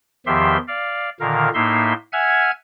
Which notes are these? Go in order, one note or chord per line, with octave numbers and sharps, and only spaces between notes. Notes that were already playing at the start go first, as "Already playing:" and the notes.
E2 D#3 F3 G4 E5 C6
D5 F5
A#2 D3 D#3 A#4 F5
A2 A#3 D#4 E5 C6
E5 F#5 G#5 F6 G#6